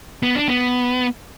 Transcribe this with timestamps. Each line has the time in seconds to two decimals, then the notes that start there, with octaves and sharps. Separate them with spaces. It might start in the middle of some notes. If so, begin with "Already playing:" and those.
0.23 B3
0.35 D4
0.48 B3